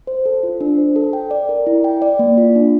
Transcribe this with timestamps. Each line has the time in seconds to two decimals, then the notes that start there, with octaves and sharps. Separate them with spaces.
0.07 C5
0.26 A4
0.43 F4
0.61 D4
0.78 C5
0.96 A4
1.13 G5
1.31 D5
1.49 A#4
1.67 E4
1.84 G5
2.02 D5
2.19 A#3
2.38 F4
2.55 D4